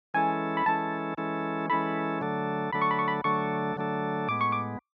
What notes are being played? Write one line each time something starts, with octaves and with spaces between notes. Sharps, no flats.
E3 G#3 C#4 E4 A4 G#5
B5
E3 G#3 C#4 E4 A4 A5
E3 G#3 C#4 E4 A4
E3 G#3 C#4 E4 A4 B5
D3 F#3 A3 D4 A4
D3 F#3 A3 D4 A4 B5
C#6
B5
C#6
B5
D3 F#3 A3 D4 A4 C#6
D3 F#3 A3 D4 A4
A2 G#3 B3 D6
C#6
D6